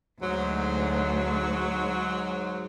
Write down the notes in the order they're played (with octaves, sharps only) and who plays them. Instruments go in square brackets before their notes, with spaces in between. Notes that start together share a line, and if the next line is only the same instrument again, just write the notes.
[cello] D2 [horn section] G#2 F#3